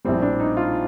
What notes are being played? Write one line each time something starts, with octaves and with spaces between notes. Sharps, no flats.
A#1 A2 G3 C4
D4
D#4
F4